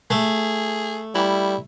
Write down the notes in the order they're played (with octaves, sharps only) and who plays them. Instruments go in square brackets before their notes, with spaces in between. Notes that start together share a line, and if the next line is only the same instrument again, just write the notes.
[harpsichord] A3 [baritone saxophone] G#4
[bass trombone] G3 [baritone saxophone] E4